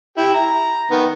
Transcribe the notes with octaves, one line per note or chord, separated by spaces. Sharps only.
E4 G4
A#5
D#3 B3